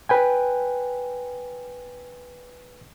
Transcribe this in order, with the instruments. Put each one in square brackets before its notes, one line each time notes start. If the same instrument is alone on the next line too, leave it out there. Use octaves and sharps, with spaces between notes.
[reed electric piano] B4 G5 G#5